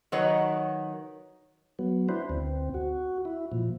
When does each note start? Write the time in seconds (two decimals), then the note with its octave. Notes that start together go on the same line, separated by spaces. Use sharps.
0.12 D#3 F#3 D#4 B4 C#5
1.79 F#3 B3
2.09 D4 E4 B4 C5
2.29 D2 C4
2.74 F#4
3.25 E4
3.52 A#2 F3